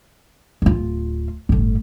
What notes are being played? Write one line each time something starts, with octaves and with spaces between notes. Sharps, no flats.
D1 F4
G1 A2